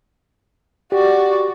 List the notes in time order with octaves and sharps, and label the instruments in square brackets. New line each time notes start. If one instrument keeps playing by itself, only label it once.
[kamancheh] F#4 D5 [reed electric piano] G4